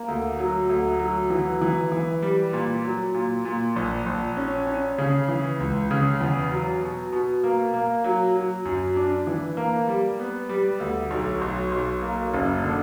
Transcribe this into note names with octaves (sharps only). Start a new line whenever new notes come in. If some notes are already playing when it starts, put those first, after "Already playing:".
Already playing: A#3
D2
F#3
D2
F#3
E3
E3
E3
G3
A#2
F#3
A#2
A#2
A#1
A#1
C#4
C#4
C#3
E3
C#2
C#3
E2
F#3
B2
B2
A#3
A#3
F#3
F#3
F#2
D4
E3
A#3
G3
B3
G3
D2
B1
B1
B1
A#3
F#1
D3